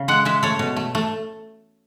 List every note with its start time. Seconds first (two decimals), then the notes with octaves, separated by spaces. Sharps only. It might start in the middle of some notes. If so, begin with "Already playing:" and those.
Already playing: C#3
0.08 G#3 F#5
0.25 G#3 E5
0.43 A3 C#5
0.59 B2
0.76 A3
0.95 A3